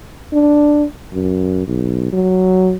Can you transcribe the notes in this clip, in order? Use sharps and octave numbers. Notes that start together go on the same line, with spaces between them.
D4
F#2
B1
F#3